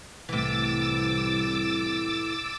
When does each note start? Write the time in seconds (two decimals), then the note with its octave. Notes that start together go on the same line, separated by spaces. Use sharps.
0.29 C2 A2 E3 D6 E6 A6